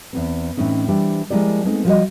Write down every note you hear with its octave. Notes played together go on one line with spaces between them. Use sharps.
E2 B3 C4
A2 E3 C4 C#4 D#4
E3 G3 D4 C5 G5
F3 G#3 A#3 E4 G4 D5
G#3 A3 B3 C4 D#4
F3 G3 F#4 G4 C#5 D#5